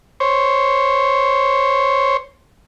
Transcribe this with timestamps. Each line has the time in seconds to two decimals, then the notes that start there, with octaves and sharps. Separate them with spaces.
0.20 C5 C#5